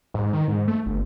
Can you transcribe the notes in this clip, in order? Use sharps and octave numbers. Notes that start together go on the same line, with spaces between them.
G#2
D#3
G#2
A3
G1